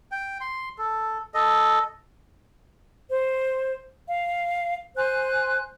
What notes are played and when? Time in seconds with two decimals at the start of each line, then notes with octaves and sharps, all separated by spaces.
0.12 G5
0.41 C6
0.78 A4
1.34 A4 D#5
3.10 C5
4.08 F5
4.96 C5 G#5 F#6